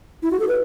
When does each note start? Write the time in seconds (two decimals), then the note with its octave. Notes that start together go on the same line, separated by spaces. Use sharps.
0.23 E4
0.31 F#4
0.40 A4
0.48 B4